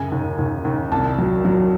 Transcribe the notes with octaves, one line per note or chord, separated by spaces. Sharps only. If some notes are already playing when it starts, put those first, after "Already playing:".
Already playing: F#2 C#3 G#5
D#2
D#2
D#2
C2 A5
F#3
F#3